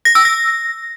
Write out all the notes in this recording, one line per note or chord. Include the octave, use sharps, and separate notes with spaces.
A#6
E6
A#6